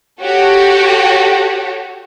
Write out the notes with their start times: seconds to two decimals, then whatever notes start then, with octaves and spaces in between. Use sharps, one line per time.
0.21 F#4 G4 A4 C#5